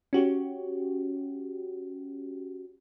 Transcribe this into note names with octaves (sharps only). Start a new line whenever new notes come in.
C#4 F#4 G4